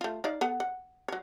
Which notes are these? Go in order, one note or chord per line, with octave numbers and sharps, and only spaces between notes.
A3 F4
D#4 D5 F5
B3 A4 F#5
F#5
F#3 C#5